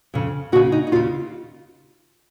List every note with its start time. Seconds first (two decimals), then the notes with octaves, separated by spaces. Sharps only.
0.14 F2 C#3
0.52 D#2 F#4
0.55 C#3
0.72 D#4
0.87 D#4
0.92 D#2 C#3 F4